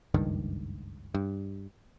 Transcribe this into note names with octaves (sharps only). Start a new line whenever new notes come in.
F#1 C#2 G2 D#3
G2